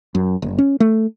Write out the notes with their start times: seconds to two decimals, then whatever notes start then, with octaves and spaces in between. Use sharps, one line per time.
0.15 F#2
0.42 F#1
0.58 C#4
0.80 A3